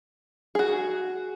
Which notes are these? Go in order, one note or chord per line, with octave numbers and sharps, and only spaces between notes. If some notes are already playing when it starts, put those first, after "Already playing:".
F#4 G#4